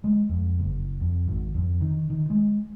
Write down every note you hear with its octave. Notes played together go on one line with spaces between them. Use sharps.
G#3
F2
F#1
F2
G#1
F2
D#3
D#3
G#3